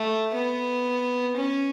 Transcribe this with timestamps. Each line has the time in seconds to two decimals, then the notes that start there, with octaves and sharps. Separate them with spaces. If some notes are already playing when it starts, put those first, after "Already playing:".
Already playing: A3
0.34 B3
1.37 C#4